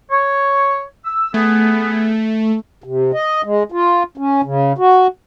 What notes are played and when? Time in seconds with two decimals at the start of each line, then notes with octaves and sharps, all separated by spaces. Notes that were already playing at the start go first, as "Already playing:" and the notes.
0.11 C#5
1.05 E6
1.34 A3 B3 G#4
2.84 C3
3.14 D#5
3.44 G#3
3.72 F4
4.17 C#4
4.44 C#3
4.78 F#4